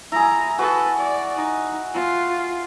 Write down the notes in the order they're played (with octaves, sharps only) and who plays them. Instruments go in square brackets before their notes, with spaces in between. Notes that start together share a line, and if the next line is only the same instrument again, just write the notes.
[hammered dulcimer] E4 G#4 [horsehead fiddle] A#5
[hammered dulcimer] F#4 [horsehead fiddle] A4 B4
[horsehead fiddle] D5
D#4
F4